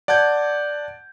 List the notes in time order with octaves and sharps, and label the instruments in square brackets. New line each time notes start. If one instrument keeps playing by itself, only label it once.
[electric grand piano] D5 F#5 A5 G6 G#6